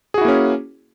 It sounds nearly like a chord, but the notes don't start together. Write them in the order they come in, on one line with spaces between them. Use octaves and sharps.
G#4 F#4 E4 A#3 C#4